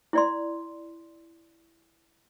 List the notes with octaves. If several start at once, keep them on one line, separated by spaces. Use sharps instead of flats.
E4 D5 C6